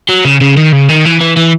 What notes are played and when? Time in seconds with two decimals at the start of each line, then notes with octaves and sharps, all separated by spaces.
0.09 F#3
0.25 C#3
0.41 C#3
0.57 D#3
0.72 C#3
0.89 D#3
1.05 E3
1.20 E3
1.37 E3